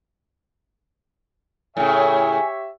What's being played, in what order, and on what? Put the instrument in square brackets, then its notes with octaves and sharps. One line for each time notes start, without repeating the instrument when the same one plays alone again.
[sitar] A2 C#3 [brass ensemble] G4 C#5 E5 [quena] G#5